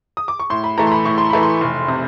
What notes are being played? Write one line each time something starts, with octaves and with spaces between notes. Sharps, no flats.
D#6
D6
C#6
A2 C6
B5
E3 A3 A#5
C6
B5
A2 C#6
C6
E3 A3 B5
C6
F1
C3